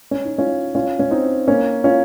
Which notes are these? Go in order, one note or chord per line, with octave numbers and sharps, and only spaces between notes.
C#4
D#4
C#4 F4
C#4 F4
C#4
C4 D#4
A#3 C#4
C#4 F4